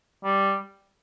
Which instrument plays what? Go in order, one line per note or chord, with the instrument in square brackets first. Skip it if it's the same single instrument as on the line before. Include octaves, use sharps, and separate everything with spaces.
[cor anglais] G3